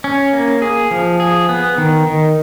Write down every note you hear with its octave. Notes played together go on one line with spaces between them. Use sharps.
C#4
A#3
G#4
F3
G#4
B3
D#3
D#3